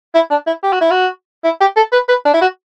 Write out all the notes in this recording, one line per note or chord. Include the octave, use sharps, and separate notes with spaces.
E4
D4
E4
G4
F#4
E4
F#4
E4
G4
A4
B4
B4
D4
E4
F#4